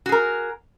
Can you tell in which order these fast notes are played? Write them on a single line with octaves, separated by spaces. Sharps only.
F#4 G#4 A#4